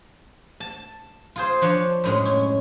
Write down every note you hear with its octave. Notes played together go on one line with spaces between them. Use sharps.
A5
F4 G#4 C5
F3 D4 C#5
F#2 A2 G#3
C#4